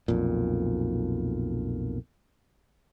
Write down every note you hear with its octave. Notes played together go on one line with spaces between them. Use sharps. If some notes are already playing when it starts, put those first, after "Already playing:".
B1 F2 A#2